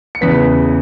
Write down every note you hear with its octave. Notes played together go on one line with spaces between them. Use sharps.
C#7
E2 C#3 E3 B3 B6